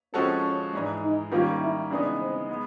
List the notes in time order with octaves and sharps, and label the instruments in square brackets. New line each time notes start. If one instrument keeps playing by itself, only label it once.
[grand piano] F3 G#3 C#4 F#4 A4 [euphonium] C4
[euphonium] C#4
[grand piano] G#2 E3 G#3 [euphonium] D4
[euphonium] D#4
[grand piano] D#3 G3 A#3 C#4 [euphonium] F4
[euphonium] E4
[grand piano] C#3 E3 G#3 B3 D#4 [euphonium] D4
[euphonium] C4
[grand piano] G#3 B3